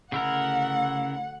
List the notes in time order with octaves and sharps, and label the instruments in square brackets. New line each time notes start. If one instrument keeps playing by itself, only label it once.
[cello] D2 F#5 [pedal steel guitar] C#3 E4 A#4